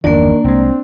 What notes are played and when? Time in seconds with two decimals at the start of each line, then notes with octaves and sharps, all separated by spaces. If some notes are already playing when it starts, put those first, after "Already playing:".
0.04 G1 E2 D#3 A#3 D4 D5
0.44 C2 G#3 C4